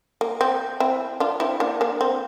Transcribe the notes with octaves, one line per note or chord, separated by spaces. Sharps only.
A#3
C4
C4 E4
D4 F4
C4 E4
A#3 D4
A#3 D4
C4